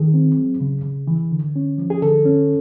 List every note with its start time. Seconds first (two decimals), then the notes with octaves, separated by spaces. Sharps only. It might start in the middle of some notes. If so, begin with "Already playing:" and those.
Already playing: D#3 G#4
0.14 C4
0.38 F#3
0.60 C#3
0.84 C#3
1.07 E3
1.32 D3
1.56 C#4
1.78 F3
1.90 G#4
2.02 D3 A4
2.25 C#4